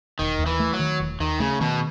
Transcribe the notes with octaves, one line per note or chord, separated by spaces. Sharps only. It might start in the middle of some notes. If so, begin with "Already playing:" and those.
E1 D#3
D#2
E3
A3
F#3
D#3
E1
D#2 D#3
C#3 A3
B2 D#3